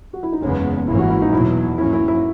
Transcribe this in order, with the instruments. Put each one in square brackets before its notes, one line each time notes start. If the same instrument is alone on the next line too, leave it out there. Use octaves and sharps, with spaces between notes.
[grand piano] F#4
E4
D#4
[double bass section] F#1 E2 C#3 G#3 B3 [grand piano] C#4
[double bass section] G#1 G#2 E3 A#3 C#4 [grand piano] E4
[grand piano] F#4
E4
D#4
[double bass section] E2 B2 F#3 [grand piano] E4
[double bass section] G#2 F#3 A#3 C#4 [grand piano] E4
[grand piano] E4
E4